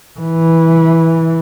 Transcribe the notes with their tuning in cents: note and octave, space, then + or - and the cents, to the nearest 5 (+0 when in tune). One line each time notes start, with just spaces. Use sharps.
E3 -10